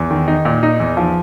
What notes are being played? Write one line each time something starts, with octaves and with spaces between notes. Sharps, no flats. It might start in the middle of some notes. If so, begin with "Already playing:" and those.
Already playing: E2
D#3
D#4
A#2
D#4
E2
F3